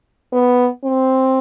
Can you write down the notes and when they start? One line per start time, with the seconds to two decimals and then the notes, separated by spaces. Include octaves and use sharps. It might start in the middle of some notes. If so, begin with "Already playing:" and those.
0.33 B3
0.84 C4